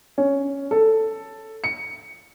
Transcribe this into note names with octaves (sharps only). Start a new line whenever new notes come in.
C#4
A4
C#7